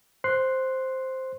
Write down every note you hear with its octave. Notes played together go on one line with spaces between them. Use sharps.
C5 C6 F#6 C7